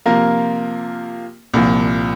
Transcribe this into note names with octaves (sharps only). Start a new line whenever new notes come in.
C3 F3 A#3 F4 A#4
C2 A#2 F3